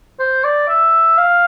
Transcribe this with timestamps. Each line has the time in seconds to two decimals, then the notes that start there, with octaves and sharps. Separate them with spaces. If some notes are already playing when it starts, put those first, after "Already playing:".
0.19 C5
0.44 D5
0.68 E5
1.18 F5